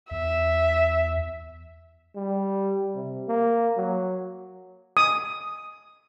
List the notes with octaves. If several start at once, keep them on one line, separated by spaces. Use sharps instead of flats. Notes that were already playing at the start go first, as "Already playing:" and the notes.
E2 E5
G3
C3
A#3
F#3
D#6